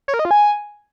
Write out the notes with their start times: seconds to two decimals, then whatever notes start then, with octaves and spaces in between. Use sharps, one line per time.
0.08 C#5
0.14 A#4
0.19 D#5
0.25 F4
0.31 G#5